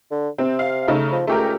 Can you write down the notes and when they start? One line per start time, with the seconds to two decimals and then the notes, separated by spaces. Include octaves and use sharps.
0.11 D3
0.38 C3 C4
0.59 F5
0.88 C#3 A3 D#4
1.12 F3
1.27 C#2 A3 G4 A#4